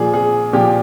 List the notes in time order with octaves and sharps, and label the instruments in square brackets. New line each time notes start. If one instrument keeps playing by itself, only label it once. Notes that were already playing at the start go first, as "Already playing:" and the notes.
Already playing: [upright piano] A#2 F3 G#4
G#4
A#2 F3 G4